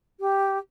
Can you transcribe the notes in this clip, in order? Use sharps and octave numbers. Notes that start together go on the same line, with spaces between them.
G4